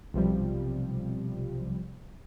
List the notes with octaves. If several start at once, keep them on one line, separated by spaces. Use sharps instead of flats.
B1 C3 F3 G3